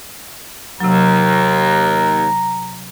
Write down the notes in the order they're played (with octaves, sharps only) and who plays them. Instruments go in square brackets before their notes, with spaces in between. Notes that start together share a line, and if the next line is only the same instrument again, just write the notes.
[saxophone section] D#2 [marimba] C3 F#3 [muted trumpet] A#5